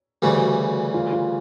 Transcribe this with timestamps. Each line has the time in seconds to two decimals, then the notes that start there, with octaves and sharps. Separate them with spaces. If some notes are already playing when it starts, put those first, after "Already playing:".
0.22 D2 C#3 E3 G3 F#4
0.94 F4
1.12 F4